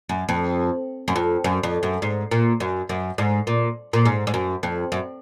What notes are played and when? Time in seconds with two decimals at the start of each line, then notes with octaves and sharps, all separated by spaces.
0.09 F#2
0.29 F2
1.08 F#2
1.16 F2
1.44 F#2
1.63 F2
1.83 F#2
2.02 G#2
2.31 A#2
2.60 F#2
2.89 F#2
3.18 G#2
3.47 A#2
3.93 A#2
4.05 G#2
4.27 G#2
4.34 F#2
4.63 F2
4.92 F#2